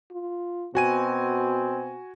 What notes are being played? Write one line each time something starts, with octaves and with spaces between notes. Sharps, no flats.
F4
B2 C4 F#4 G#5 D#7